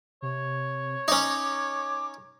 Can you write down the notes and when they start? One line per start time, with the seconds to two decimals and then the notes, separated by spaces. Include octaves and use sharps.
0.22 C3 C#5
1.08 C#4 D#4 D6